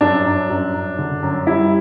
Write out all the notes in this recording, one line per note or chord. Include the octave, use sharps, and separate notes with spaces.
F#2 D4
F#2
F#2
F#2
D3
F#2
G3 E4